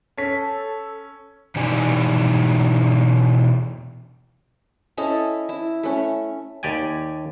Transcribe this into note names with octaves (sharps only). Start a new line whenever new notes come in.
C#4 A4 B6
B2 E3 D#4 G4 D5 G#5
C#4 E4 A4 D#5
E4
A3 C#4
D#2 G4 D5 G5 G#5